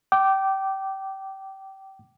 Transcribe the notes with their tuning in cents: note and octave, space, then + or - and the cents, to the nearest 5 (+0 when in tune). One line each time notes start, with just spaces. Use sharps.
G5 -25 D6 +0